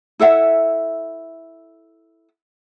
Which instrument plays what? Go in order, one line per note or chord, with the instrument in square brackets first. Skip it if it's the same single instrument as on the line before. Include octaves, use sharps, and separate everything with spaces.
[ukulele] E4 A4 E5 F#5